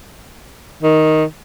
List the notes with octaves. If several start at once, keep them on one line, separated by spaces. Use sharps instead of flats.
D#3